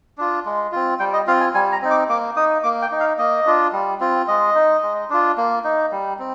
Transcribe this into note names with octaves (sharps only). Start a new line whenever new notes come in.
D4 F4
G#3
C4 F4
G3 G5
D#5
C4 F4 F5
G#5
G3 G#5
A#5
C4 D#4
D6
A#3 D6
D#4 D#6
A#3 D6
G5
D#4
F5
A#3 D#5
D4 F4
G3
C4 F4
G#3 D#5
D#4
G#3
D4 F4
A#3
D#4
G3
C4